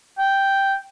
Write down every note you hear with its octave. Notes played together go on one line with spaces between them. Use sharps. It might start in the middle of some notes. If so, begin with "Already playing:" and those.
G5